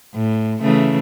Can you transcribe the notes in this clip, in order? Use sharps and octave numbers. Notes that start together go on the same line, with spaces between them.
A2
C#3 E3 A3